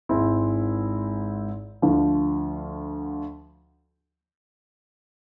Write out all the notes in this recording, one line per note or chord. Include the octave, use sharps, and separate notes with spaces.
G#1 G#2 G#3 C4 E4
D2 D3 F3